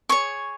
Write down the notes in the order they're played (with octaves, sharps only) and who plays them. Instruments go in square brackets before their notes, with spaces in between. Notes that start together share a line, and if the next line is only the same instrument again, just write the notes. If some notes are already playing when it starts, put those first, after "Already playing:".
[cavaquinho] G#4 C#5 C#6